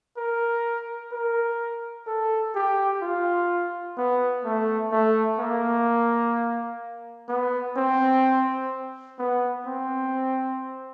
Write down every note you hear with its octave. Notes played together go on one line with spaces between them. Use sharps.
A#4
A#4
A4
G4
F4
B3
A3
A3
A#3
B3
C4
B3
C4